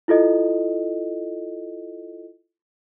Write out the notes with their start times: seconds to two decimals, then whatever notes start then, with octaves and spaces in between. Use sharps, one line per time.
0.08 E4 F4 A4 D#5